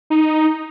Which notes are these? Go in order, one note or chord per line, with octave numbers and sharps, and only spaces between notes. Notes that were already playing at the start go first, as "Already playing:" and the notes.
D#4